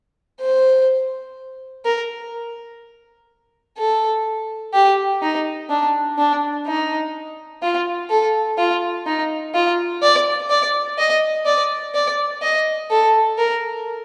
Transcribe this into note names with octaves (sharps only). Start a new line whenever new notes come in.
C5
A#4
A4
G4
D#4
D4
D4
D#4
F4
A4
F4
D#4
F4
D5
D5
D#5
D5
D5
D#5
A4
A#4